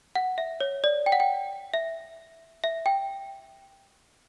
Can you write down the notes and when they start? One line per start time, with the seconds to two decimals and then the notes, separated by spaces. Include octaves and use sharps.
0.15 F#5
0.38 E5
0.60 C#5
0.84 D5
1.06 G5
1.12 F#5
1.20 G5
1.74 E5
2.64 E5
2.86 G5